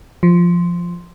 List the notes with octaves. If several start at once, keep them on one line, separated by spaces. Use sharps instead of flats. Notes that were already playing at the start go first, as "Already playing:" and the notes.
F3